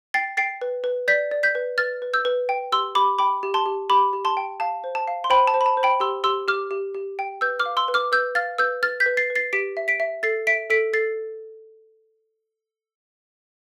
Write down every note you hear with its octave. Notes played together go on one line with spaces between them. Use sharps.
G5 A6 C7
G5 A6 C7
B4
B4
D5 G6 B6
D5
G6 B6
B4
B4 F6 A6
B4
E6 G6
B4
G5
G4 C6 E6
G4 B5 D6
G5 B5 D6
G4
A5 C6
G4
G4 B5 D6
G4
A5 C6
G5
F5 A5
C5
A5
F5
C6
C5 G5 B5
A5
C5
B5
A5
C5
G5 B5
G4 C6 E6
G4 C6 E6
G4 D6 F6
G4
G4
G5
B4 E6 G6
D6 F6
F5
C6 E6
B4
D6 F6
B4 E6 G6
F5 F6 A6
B4 E6 G6
B4 F6 A6
G6 B6
B4
A6 C7
B4
A6 C7
G4 B6 D7
E5
B6 D7
E5
A4 A6 C7
E5 B6 D7
A4 B6 D7
A4 A6 C7